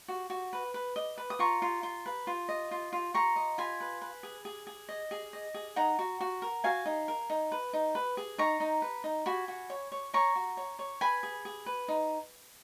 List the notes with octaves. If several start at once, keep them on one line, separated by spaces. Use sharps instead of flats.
F#4
F#4
B4
B4
D#5
B4
D#6
F4 A#5 C#6
F4
F4
B4
F4
D#5
F4
F4
F4 A#5 C#6
D#5
F4 G#5 B5
B4
B4
G#4
G#4
G#4
D#5
G#4
D#5
G#4
D#4 F#5 A#5
F#4
F#4
A#4
F#4 F5 G#5
D#4
A#4
D#4
B4
D#4
B4
G#4
D#4 A#5 C#6
D#4
B4
D#4
F#4 G#5 B5
F#4
C#5
C#5
C#5 A#5 C#6
F#4
C#5
C#5
B4 G#5 B5
G#4
G#4
B4
D#4